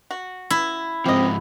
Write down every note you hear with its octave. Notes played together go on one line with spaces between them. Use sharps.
F#4
E4
G#2 F3 C4 G4 D#5